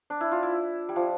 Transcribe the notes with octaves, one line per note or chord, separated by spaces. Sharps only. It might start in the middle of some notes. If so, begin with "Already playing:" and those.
D4
E4
F4
E4
G3
F3